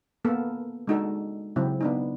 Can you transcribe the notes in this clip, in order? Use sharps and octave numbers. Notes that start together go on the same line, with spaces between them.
A#3 B3 A4
G#3 D4 D#4 F#4 A4
C#3 F#3 C4 E4
B3 D4 D#4